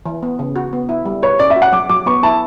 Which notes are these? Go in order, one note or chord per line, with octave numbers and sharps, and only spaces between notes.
E3
B3
C#3
F#4
B3
E4
G3
B4 C#5
C#4 D5
E5
F#4
F#5
F#3 D6
F#3 D6
B3 C#6
E4 A5